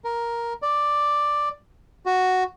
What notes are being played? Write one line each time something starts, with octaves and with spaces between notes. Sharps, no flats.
A#4
D5
F#4